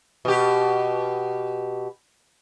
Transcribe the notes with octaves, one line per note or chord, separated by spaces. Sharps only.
B2 G4